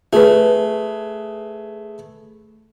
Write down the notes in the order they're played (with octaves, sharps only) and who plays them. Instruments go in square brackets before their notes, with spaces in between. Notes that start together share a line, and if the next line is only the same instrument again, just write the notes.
[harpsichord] A3 [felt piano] G#4 B4